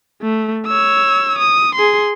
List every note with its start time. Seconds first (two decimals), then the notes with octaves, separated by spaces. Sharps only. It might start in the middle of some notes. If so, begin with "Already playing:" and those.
0.22 A3
0.67 C#5 E6
1.39 D#6
1.75 G#4 C6